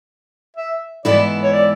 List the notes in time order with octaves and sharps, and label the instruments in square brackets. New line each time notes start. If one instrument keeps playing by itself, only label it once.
[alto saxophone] E5
[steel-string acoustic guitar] G#2 E3 B3 E4 A4 [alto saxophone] D5
[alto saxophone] C#5
D5